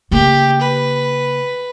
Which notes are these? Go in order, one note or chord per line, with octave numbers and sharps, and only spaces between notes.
C#3 A#3 G4
B4